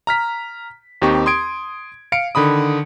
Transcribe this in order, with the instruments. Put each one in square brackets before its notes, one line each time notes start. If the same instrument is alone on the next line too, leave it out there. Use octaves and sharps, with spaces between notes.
[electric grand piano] A#5 F6 B6
D#2 C4 D#4 G4 C#6
C6 D#6 G#6 D7
F5 C#7 D7
D3 D#3 B5 D#6